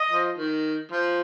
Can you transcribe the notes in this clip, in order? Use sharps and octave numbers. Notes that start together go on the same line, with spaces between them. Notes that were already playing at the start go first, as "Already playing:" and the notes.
Already playing: D#5
F3
D#3
F3